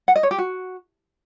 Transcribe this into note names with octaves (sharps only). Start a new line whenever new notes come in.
F#5
D#5
C#5
G4
F#4